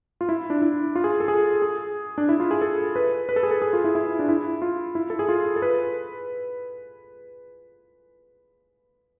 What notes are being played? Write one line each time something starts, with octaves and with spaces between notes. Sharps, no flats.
F4
E4
D4
E4
F4
G#4
A4
G#4
G#4
D4
E4
F4
G#4
A4
B4
B4
A4
G#4
A4
G#4
F4
E4
E4
D4
E4
F4
E4
A4
G#4
F4
A4
B4